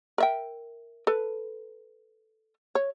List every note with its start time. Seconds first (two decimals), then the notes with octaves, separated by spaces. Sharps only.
0.18 A#4 E5 G5
1.07 A4 B4
2.75 C#5